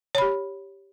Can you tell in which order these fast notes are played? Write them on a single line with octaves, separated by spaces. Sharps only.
C#5 B5 G4